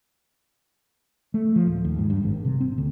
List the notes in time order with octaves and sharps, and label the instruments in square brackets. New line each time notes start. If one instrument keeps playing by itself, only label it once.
[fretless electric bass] A3
F3
D1
D#2
G#2
G2
G#1
C3
C4
D2